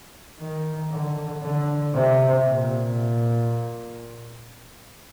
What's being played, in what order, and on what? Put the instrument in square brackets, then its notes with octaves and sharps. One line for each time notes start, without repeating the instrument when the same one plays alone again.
[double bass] D#3
D3
D3
C3
A#2